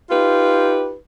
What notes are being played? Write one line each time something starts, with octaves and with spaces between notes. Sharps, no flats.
D#4 F4 G4 B4